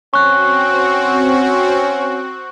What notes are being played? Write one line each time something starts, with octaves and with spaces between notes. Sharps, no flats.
C4 C#4 F#4 C#6 F#6